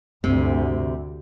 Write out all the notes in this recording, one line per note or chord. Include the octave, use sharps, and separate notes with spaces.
D2 G2 C3 C4